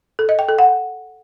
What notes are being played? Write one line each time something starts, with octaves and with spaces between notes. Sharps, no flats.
A4
D#5
G5
A4
F#5